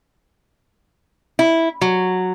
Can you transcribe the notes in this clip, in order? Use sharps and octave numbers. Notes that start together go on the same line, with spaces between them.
E4
F#3